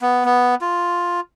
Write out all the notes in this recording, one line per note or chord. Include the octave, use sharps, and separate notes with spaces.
B3
B3
F4